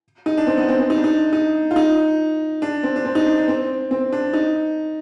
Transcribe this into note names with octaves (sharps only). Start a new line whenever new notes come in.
D#4
D4
C4
B3
C4
C4
D#4
D4
D#4
D#4
F4
D#4
D4
C4
D4
C4
D#4
D4
D4
C4
C4
D4
D#4